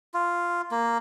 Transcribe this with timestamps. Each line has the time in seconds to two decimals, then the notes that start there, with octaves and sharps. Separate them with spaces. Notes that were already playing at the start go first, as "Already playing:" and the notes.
0.14 F4
0.71 A#3